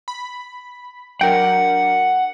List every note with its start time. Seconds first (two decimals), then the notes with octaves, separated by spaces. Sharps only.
0.08 B5
1.21 F#3 D4 A#4 F#5 G5